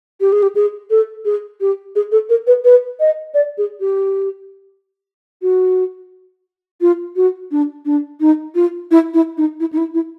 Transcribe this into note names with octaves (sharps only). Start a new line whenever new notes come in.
G4
G#4
G4
G#4
A4
G#4
G4
G#4
A4
A#4
B4
B4
D#5
D5
G#4
G4
F#4
F4
F#4
D4
D4
D#4
F4
E4
E4
D#4
E4
D#4
E4
E4